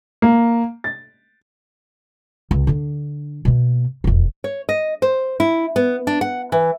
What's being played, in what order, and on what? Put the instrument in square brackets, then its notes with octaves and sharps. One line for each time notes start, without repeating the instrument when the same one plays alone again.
[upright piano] A#3
A6
[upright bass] C#2
D3 D4
B2 A#3
E1 F2
[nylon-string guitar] C#5
D#5
C5
E4
B3
D4
F#5
E3